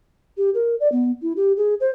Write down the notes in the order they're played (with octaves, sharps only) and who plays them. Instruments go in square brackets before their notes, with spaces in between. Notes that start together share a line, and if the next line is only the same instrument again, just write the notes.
[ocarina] G4
A#4
D5
B3
E4
G4
G#4
C5